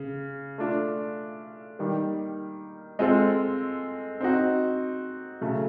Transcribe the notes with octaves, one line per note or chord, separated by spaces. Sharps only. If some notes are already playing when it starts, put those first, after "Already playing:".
Already playing: C#3
A3 D4 F4
D#3 G3 A#3
G#3 C4 F4 A4
C4 D#4 F#4
C#3 F#3 A3